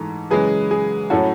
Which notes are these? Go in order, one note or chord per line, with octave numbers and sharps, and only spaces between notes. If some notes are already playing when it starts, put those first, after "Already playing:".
Already playing: G#2 E3 A3
F#2 C#3 E3 G#3 G#4 B4
G#4
A2 F#3 C#4 E4 F#4 A4